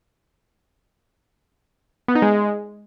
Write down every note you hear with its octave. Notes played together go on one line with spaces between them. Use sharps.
B3
D#4
G#3